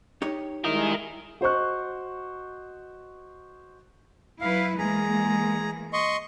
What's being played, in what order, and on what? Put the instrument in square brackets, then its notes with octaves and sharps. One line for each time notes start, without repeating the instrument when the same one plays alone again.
[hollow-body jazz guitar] D#4 G4 C#5
[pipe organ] G3 G#3 G#4 [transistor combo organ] E4 [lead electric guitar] A#4 D#5
[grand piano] F#4 C5 D#5 C#6 F#6
[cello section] F#3 E4 B4 [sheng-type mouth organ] F5
[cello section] E3 G#3 A#3 [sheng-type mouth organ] G#4 A#5
[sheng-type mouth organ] D#5 C6 C#6